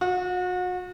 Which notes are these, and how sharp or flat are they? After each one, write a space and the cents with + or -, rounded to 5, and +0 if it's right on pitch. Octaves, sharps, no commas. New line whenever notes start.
F#4 -35